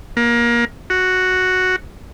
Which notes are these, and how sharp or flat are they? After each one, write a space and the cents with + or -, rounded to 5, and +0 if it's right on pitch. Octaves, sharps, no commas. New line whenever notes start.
A#3 +25
F#4 +0